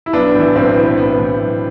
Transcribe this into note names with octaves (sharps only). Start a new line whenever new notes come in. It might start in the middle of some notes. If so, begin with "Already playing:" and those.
E4
B1 B3 D4
A2 E3
B1 C4
B3
A2 E3
B3
B1 B3
A2 E3
B1